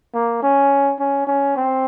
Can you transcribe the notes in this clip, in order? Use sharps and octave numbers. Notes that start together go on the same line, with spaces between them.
A#3
C#4
C#4
C#4
C4